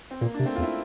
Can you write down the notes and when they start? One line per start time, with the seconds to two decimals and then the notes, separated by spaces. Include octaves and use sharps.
0.11 C4
0.21 A#2 A#3
0.34 D4
0.39 C3
0.45 A3 C4
0.56 E2 F4
0.63 E4